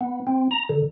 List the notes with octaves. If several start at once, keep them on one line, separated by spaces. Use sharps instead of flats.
B3
C4
A#5
D3